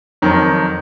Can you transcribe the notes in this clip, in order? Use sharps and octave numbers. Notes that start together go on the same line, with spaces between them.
F2 D#3 F#3